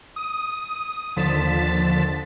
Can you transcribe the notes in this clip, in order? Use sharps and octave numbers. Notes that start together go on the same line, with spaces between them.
D#6
D#2 D3 F3 A6 B6 E7